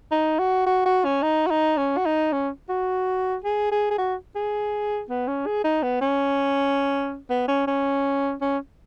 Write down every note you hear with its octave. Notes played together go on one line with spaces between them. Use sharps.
D#4
F#4
F#4
F#4
C#4
D#4
F#4
D#4
C#4
F#4
D#4
C#4
F#4
G#4
G#4
G#4
F#4
G#4
B3
C#4
G#4
D#4
B3
C#4
B3
C#4
C#4
C#4